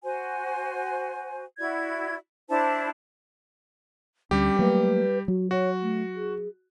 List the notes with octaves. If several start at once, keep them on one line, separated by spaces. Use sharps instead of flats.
F#4 C5 G#5
E4 F#4 D5 G#6
D4 E4 C5 A5
D2 G3 C#4 G4
F#3 A3 A#3 B4
F#3 F#4
F#4 C#5
A3
G#4